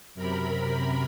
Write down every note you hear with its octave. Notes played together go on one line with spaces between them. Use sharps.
F#2 C3 A#4 B5